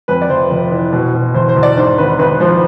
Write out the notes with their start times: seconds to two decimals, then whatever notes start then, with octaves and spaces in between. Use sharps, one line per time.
0.08 F2 B4
0.22 D5
0.29 F1 C5
0.50 F1
0.72 E3
0.93 B2
1.14 B2
1.35 E2 C5
1.49 C5
1.56 E2
1.63 D5
1.77 G#2 C5
1.98 G#1 B4
2.19 G#1 B4
2.40 F3 C5